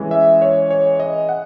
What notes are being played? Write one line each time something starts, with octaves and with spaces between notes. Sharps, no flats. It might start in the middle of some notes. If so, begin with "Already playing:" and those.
Already playing: E3 G#3 C#4
E5
C#5
C#5
D#5
F#5